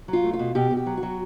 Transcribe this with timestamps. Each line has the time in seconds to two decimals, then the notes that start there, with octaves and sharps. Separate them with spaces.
0.08 F#3
0.13 F4
0.24 A3
0.33 F4
0.39 B2
0.55 B2 G4
0.71 B2
0.77 G4
0.86 F#3
0.97 F#4
1.03 F#3